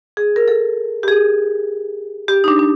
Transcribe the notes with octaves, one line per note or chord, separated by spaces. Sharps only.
G#4
A#4
A4
G4
G#4
G4
D#4
D4
D4